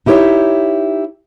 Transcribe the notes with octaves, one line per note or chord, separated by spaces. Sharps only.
D#4 E4 G4 A#4 C#5 E5